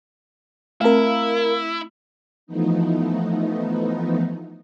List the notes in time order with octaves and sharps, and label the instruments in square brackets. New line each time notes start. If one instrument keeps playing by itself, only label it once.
[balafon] A3 C4 [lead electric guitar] E4 [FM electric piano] A#4 F5
[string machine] E3 F3 A3 B3 D#4